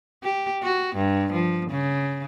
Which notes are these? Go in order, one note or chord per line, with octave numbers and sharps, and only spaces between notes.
G4
F#4
G2
F3
C#3